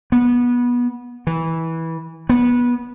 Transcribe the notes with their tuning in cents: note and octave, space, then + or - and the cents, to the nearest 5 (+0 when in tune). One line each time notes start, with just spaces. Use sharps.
B3 -20
E3 -15
B3 -20